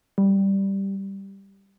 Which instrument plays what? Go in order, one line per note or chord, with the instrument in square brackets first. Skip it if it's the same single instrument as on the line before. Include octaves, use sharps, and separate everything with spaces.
[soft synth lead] G3